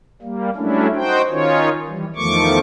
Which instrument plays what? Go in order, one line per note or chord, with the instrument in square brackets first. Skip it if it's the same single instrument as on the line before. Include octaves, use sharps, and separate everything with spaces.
[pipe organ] G3 A#3
F#3 G3 A3 C#4 D4 E4
D#4 F#4 C5 G5
D#3 C#4 D#4 F4 C#5
E3 G3
E2 D#3 F3 A3 C#6 D6